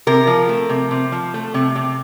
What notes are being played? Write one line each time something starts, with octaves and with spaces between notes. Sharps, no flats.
C3 A#4
F3
A3
C3
C3
F3
A3
C3
C3